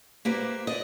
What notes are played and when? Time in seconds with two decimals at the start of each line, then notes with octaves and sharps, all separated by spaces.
0.25 A#3 E4 G4 B4 C5
0.67 D5 D#5